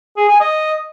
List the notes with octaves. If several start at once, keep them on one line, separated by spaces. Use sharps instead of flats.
G#4
G#5
D#5